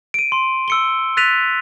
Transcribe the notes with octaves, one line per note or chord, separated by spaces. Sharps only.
D7 D#7
C6
E6 C#7 G7
E6 F#6 A6 B6 D#7 F7